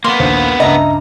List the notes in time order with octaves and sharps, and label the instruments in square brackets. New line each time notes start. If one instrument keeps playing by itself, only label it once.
[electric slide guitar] A#3 B3 [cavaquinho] C6
[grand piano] A#1 D#2 C5
[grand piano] C#2 G2 [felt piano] D#5 E5 [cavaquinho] A#5